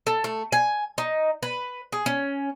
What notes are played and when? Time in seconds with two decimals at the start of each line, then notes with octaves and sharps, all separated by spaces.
0.07 A4
0.24 A3
0.52 G#5
0.98 D#4
1.43 B4
1.92 G#4
2.06 C#4